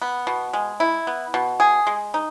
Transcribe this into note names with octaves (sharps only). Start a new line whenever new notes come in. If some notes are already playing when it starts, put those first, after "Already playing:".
B3
B2
G#3
E4
B3
B2
G#4
G#3
D#4